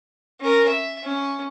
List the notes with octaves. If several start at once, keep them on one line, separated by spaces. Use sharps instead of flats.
C#4 A#4
E5
C#4